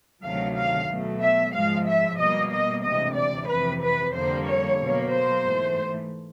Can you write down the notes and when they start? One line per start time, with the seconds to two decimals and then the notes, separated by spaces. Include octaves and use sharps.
0.23 D2 C3 D#3 F#3 A3 F5
0.56 F5
0.88 B2 F#3 A3
1.21 E5
1.53 G#2 F3 G#3 F5
1.86 E5
2.19 B2 G3 A#3 D#5
2.51 D#5
2.84 D2 C3 E3 G#3 D#5
3.17 D5
3.49 F2 C3 E3 B4
3.82 B4
4.14 F2 D3 G3 A#3 C5
4.47 C#5
4.79 B2 F#3 A#3
5.11 C5
5.44 G#2 E3 A3